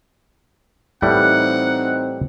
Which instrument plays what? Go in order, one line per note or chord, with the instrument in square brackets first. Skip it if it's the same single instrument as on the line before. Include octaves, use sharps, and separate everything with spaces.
[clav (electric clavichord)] A2 E3 G3 [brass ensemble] C4 D#4 [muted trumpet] F#5